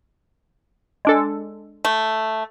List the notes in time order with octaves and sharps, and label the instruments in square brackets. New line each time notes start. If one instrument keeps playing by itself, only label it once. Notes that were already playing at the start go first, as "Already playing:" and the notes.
[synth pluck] G#3 D4 A4
[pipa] A3